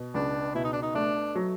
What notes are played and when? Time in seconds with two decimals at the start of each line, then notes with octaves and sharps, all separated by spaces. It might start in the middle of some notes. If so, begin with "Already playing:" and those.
Already playing: B2
0.14 C#2 D4
0.55 B2 E4
0.64 D#4
0.73 D4
0.82 D#4
0.95 A3 D4
1.36 F#3